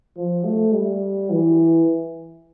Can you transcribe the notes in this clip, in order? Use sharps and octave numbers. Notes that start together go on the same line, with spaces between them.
F3
A3
G3
E3